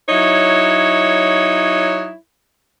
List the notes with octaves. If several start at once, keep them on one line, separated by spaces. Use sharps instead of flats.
F#3 D#4 E4 C#5